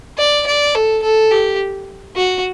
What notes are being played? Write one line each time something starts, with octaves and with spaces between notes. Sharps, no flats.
D5
D5
A4
A4
G4
F#4